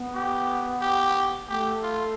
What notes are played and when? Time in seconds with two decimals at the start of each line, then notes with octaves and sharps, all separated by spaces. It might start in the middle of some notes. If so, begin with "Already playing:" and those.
Already playing: B3
0.15 G4
0.81 G4
1.49 A3 G4
1.83 F4